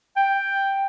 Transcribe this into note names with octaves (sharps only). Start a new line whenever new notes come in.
G5